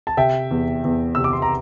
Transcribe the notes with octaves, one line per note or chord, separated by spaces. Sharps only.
A5
C3 E5 G5
E2
E2
C3 E6
D6
C6
A#5